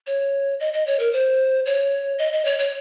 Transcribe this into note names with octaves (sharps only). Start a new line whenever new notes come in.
C#5
D#5
D#5
C#5
A#4
C5
C#5
D#5
D#5
C#5
C#5